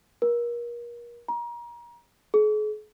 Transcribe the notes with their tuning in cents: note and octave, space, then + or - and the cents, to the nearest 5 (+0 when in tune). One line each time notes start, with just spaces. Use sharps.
A#4 +35
A#5 +30
G#4 +40